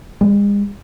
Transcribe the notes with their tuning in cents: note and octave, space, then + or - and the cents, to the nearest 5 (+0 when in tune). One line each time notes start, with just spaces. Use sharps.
G#3 -40